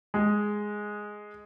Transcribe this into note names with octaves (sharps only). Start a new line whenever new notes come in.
G#3